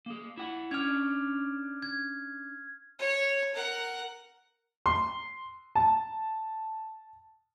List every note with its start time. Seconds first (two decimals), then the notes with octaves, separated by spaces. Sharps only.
0.06 A#3 G#4
0.37 E4 F#5
0.71 C#4 D4 F6 G#6
1.82 G#6
2.99 C#5
3.54 A#4 F#5
4.86 C6
5.75 A5